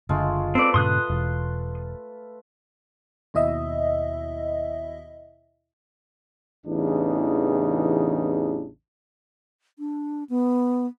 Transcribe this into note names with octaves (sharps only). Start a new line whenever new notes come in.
F#1 D3 G#3 A3 F4
C4 A4 B4 D5
G2 A#2 C#3 C6 D#6 F#6
E1
D#2 B2 E4 D#5 E5
A1 E2 C#3 D4 D#4
D4
B3